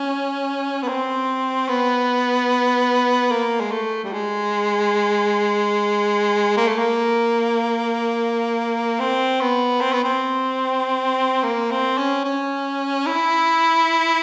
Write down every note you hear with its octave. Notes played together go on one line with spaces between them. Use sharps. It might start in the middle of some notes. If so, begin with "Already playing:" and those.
Already playing: C#4
B3
C4
B3
A#3
G#3
A3
G3
G#3
A#3
A3
A#3
C4
B3
C4
B3
C4
A#3
C4
C#4
C#4
E4